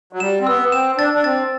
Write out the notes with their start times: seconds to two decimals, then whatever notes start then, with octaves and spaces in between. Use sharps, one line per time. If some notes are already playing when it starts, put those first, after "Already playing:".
0.13 F#3
0.20 G3 E7
0.41 C4
0.46 B3 E6
0.72 C4 E7
0.98 D4 A6
1.13 D4
1.24 C4 A6